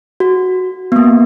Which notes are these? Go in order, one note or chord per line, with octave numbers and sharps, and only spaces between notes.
F#4
A#3 B3